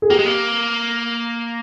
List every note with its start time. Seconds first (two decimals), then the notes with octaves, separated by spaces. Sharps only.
0.02 G#4
0.10 A#3 G4
0.19 G#3
0.26 A#3